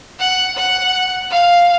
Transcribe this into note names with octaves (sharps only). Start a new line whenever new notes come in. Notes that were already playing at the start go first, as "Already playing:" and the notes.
F#5
F#5
F5